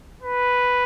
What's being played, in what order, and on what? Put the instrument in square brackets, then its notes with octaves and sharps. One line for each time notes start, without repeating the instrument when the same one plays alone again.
[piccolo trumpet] B4